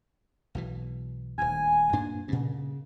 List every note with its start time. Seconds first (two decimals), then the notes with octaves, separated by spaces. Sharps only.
0.55 B1 B2 E3
1.38 D#1 D2 G#5
1.93 G2 A#2 D4
2.28 G2 A#2 C#3